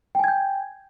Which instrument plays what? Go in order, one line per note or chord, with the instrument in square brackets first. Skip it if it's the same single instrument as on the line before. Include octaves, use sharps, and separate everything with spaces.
[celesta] G5
G#5
G#6
G6